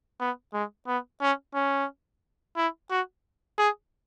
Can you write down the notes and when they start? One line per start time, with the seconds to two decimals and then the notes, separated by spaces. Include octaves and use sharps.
0.20 B3
0.53 G#3
0.87 B3
1.21 C#4
1.55 C#4
2.57 E4
2.90 F#4
3.58 G#4